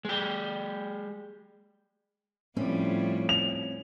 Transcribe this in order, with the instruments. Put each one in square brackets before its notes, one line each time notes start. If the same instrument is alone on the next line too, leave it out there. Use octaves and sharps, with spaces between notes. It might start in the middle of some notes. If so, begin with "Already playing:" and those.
[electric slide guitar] G#3 G4
[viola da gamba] A2 F3 G3 [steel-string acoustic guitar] C4 C#4
[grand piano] F7